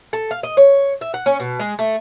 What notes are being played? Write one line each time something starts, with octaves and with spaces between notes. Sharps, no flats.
A4
F5
D#5
C#5
E5
F#5
C#4
B2
G#3
A3